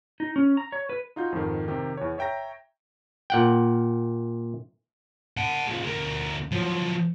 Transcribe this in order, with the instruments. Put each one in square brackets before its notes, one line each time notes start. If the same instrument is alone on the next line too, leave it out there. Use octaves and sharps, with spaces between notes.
[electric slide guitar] D#4
C#4
A#5
C#5
B4
[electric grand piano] D#4 F4 F#4 G6
F2 G#2 D#3
C3 D#3 G4
E2 C#5
C#5 E5 G5 A#5 A#6
[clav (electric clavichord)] A#2 F#5 G5
[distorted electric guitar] F#5 A5
F3 G#3
D2 A#4
F3 F#3